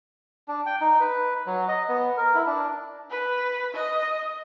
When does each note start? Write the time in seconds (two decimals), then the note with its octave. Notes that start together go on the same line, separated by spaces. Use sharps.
0.48 D4
0.66 G5
0.81 D#4
1.00 B4
1.46 F#3
1.69 D#5
1.89 B3
2.17 A#4
2.35 E4
2.47 D4
3.11 B4
3.74 D#5